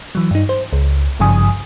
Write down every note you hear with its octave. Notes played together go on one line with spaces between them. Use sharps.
E3 F#3
G2 D#4
C5
C#2
G#1 G2 C#3 F3 G#5 D#6